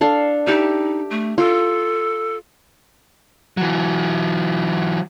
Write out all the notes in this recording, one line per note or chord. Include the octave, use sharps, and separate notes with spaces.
D4 A4 F5
D#4 G4 E5
A3
F4 A4
E3 F#3